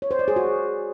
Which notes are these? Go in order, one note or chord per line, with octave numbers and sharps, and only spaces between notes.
C#5
C5
D5
G#4
F#4